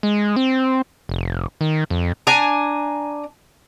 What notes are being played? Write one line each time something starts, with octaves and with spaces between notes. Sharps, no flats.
G#3
C4
F1
D#3
F2
D4 G#5 A#5